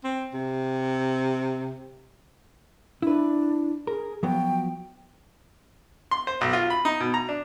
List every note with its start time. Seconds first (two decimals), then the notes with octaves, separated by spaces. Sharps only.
0.04 C4
0.34 C3
3.02 D4 E4 B4
3.87 G#4 A#4
4.23 F3 F#3 B3 G5
6.11 C6
6.27 C5
6.41 B1
6.53 F4
6.70 B5
6.85 D#4
7.00 B2
7.14 A#5
7.29 D4